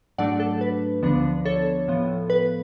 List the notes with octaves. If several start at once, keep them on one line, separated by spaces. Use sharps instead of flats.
G#2 F#3 A3 D4 D5 F#5
A4
B4
D2 D3 F3 B3 D4
A4 C#5
A2 F3 B3
B4